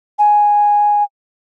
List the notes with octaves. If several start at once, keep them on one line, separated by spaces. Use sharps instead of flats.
G#5